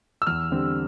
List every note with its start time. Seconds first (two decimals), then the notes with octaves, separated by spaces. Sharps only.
0.22 E6
0.27 E2 F6
0.51 D3 G3 C4